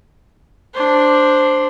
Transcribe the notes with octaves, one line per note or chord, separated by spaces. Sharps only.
D4 C5